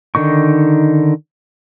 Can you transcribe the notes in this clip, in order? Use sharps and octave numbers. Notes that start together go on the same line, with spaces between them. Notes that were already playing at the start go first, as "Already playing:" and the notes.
D3 D#3 D#4 C#6